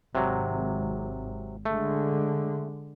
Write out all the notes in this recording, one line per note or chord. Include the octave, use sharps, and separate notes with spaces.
G#1 C3 F#3
D3 G#3 A3